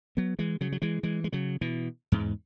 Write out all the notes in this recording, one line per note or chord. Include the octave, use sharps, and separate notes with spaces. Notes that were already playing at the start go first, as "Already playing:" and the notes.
F#3 B3
E3 G#3
C#3 F#3
F#3
E3 G#3
E3 G#3
G#3
C#3 F#3
B2 E3
E2 G#2